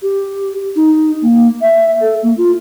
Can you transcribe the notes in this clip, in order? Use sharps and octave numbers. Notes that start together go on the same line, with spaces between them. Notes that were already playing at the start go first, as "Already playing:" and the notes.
G4
D#4
A#3
E5
A4
A#3
F4